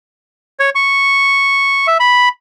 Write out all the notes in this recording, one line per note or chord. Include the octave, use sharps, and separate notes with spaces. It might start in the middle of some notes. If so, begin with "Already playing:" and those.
C#5
C#6
E5
B5